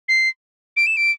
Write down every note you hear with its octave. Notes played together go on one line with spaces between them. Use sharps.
C7
D7
E7
D7